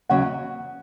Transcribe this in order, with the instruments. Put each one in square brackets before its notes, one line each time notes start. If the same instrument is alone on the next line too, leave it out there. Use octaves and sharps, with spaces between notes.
[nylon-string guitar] D#2 C#3 F#3 [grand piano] F#5